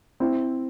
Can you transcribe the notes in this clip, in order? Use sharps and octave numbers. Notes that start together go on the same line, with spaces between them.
C4 E4